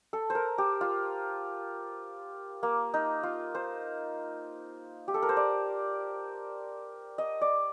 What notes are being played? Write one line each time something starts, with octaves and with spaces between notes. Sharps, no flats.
A4
C5
A#4
G4
F4
A#3
D#4
F4
C5
G4
A4
A#4
C5
D5
D#5
D5